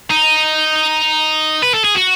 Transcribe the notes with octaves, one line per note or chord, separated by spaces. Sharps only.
D#4
B4
A4
G#4
F#4